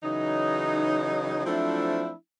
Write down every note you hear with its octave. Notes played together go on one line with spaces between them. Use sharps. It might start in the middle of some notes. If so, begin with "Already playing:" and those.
C#3 E3 F#3 D#4
F3 F#3 A3 C4 D4 E4